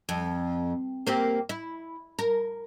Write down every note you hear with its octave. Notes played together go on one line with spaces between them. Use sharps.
F2
A#3 C4 G4
E4
A#4